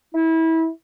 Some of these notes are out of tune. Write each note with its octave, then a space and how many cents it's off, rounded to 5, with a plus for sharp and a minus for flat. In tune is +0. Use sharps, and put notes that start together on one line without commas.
E4 -25